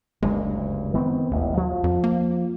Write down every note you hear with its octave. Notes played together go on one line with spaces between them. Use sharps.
F#1 D2 G2 G#3
D#3 B3 C4
E1 A1 D#2
F3
F2
A#3